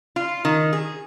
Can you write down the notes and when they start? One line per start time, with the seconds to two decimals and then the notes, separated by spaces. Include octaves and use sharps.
0.16 F4
0.45 D#3
0.73 G#4